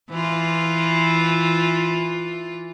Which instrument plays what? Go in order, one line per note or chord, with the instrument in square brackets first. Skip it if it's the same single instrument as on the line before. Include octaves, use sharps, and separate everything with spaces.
[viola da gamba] E3 F4